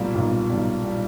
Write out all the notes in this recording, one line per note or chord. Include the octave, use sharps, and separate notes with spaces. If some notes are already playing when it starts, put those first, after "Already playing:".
Already playing: B1 A#2 G3
B1 A#2 G3
B1 A#2 G3
A#2 G3